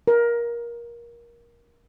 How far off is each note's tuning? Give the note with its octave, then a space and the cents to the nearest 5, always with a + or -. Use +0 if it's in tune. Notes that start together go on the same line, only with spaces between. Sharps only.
A#4 +20